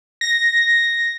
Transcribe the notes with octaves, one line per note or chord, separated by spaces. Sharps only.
A#6